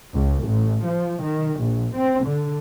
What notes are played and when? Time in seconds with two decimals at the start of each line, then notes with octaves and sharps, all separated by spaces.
0.13 C#2
0.45 A1
0.84 F3
1.23 D#3
1.60 A#1
1.95 C4
2.25 D3